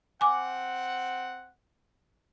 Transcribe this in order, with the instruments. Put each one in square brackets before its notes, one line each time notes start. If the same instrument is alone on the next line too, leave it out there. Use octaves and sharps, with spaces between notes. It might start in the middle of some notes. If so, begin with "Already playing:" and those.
[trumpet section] C4 F#5 [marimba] G#5 D6